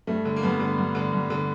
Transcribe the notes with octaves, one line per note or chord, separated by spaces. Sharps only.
G2 A3
D3
A#3
G2 B3
D3
G2
D3
G2
D3